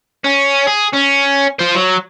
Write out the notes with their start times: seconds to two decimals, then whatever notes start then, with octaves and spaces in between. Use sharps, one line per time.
0.24 C#4
0.67 G#4
0.94 C#4
1.59 F4 C5
1.75 F#3